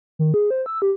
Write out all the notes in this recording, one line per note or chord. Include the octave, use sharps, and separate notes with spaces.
D#3
G#4
C5
E6
G4